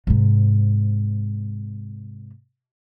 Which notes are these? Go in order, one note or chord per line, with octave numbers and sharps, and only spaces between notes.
G#2 C3